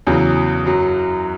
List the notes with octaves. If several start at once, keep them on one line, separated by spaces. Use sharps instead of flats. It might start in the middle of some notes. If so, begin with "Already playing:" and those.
E2 C#3 F#3
F#2 F#3